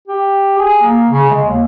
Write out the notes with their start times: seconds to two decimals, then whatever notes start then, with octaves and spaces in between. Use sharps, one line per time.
0.08 G4
0.59 G#4
0.82 A#3
1.09 C#3
1.30 G#3
1.46 D#2